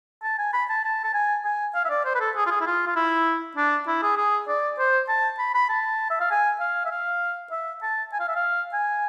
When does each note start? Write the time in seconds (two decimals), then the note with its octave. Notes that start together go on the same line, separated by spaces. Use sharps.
0.23 A5
0.39 G#5
0.53 B5
0.69 A5
0.84 A5
1.04 A5
1.14 G#5
1.45 G#5
1.75 F5
1.85 E5
1.90 D5
2.05 C5
2.15 B4
2.20 A4
2.36 G#4
2.47 F4
2.51 G#4
2.61 E4
2.67 F4
2.87 F4
2.96 E4
3.57 D4
3.87 E4
4.03 G#4
4.17 G#4
4.48 D5
4.79 C5
5.09 A5
5.39 B5
5.54 B5
5.69 A5
6.10 E5
6.20 F5
6.31 G#5
6.60 F5
6.85 E5
6.91 F5
7.51 E5
7.82 A5
8.13 G#5
8.20 F5
8.28 E5
8.36 F5
8.73 G#5